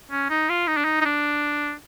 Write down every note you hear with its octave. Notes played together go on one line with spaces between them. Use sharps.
C#4
D#4
F4
D#4
D4
D#4
D#4
D4